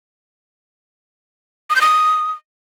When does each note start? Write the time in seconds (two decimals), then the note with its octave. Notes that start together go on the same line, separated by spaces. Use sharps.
1.70 D#6
1.76 G6
1.81 D#6